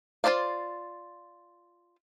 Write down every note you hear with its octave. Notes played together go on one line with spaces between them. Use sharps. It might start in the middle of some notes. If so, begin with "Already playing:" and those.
F4 A4 C5 D5 F5